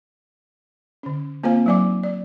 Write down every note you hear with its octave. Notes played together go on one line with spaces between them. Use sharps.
D3 C#4
A#3 C4 F4 C5 F5 G#5
F#3 D#4 D5 G#5 D6
D5